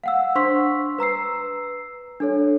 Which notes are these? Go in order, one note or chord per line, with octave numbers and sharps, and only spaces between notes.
F5 F#5 E6
D4 C5 C6 C#6 E6 B6
B4 A#5 E6 C7
D4 A4 C#5